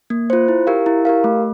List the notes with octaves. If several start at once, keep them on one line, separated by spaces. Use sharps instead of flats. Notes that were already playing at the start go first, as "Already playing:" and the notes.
A#3
F4 C5
E4
G4 A#4 F5
E4
G4 A#4 F5
A3